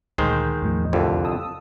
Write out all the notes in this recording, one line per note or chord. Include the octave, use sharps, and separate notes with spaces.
D2 A#2 D#3 G#3 C5
E2 A2 F3
C2 F2 D3
A5 D#6 E6